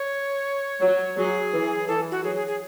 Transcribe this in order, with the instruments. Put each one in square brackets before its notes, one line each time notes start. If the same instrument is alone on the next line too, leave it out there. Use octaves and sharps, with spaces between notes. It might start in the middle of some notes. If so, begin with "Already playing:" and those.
Already playing: [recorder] C#5
[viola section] F#3
[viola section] F#3 [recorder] G#4
[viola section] E3
[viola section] E3 [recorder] A4
[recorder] F#4
[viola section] F#3 [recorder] G#4
[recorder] G#4
G#4